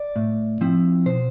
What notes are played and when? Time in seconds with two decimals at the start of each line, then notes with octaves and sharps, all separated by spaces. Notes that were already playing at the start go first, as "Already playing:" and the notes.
Already playing: D5
0.16 A2
0.61 F3 C4 E4
1.06 B2 C5